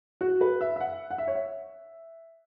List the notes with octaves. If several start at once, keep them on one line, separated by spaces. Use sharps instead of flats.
F#4
B4
E5
E5
F#5
F#5
E5
C#5
E5